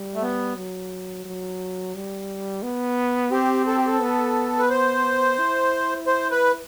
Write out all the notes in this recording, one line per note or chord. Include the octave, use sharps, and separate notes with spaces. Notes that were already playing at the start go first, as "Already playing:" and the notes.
Already playing: G3
A3
B3
F#3
F#3
G3
B3
C4 G4
A4
G4
A4
B3
B4
C5
E4
C5
B4